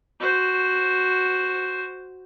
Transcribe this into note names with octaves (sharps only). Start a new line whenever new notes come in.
F#4 C5